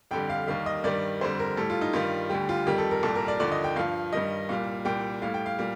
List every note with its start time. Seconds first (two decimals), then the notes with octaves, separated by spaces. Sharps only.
0.11 F2 D3 G3 G5
0.30 F5
0.47 D#2 D#3 G3 F5
0.66 D#5
0.84 G2 D#3 G3 D5
1.21 F2 D3 G3 C5
1.40 A#4
1.57 A2 G3 A4
1.70 F4
1.81 D#4
1.93 G2 D#3 G3 F4
2.30 D2 D3 G3 G4
2.49 F4
2.67 F2 D#3 G3 G4
2.78 A4
2.91 A#4
3.03 C2 A#2 G3 A4
3.16 A#4
3.28 D5
3.40 D#2 D3 F3 D5
3.52 D#5
3.64 G5
3.76 G2 F3 F5
4.13 G2 D#3 G3 D#5
4.49 C2 A#2 G3 F5
4.85 C2 A#2 G3 G5
5.22 A2 G3 F5
5.34 G5
5.46 F5
5.59 A#2 G3